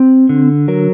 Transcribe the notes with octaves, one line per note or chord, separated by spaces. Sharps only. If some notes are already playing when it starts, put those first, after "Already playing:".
Already playing: C4
D3
F#3 A#4